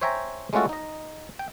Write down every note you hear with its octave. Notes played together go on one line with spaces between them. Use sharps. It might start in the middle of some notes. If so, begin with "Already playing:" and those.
C5 C#5 E5 G5 G#5 A#5
G#3 A3 C#4 F4 F#4 A4
D#4 D#5
G5